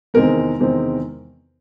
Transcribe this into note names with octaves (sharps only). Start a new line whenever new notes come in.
E2 C3 D#3 G#3 C4 A#4
E2 C3 D#3 G#3 C4